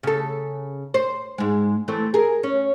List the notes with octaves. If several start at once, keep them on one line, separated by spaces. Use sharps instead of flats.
C#3 A4
C5
G#2 G#3
E3 A3 C4
G#4 A#4
C#4